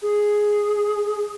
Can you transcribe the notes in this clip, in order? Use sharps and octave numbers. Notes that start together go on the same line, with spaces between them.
G#4